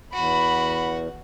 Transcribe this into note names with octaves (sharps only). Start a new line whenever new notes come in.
E2 F#4 B5